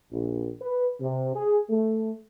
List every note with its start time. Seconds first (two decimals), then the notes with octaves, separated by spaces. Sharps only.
0.11 A#1
0.61 B4
1.01 C3
1.35 G#4
1.70 A3